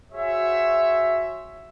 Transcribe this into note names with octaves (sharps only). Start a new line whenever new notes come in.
F#4 G#4 C5 C#5 E5